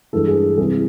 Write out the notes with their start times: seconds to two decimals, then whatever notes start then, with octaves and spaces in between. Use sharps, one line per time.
0.13 G2 E3 G#3 A4
0.28 G#4
0.58 C2 C3 E3 G#4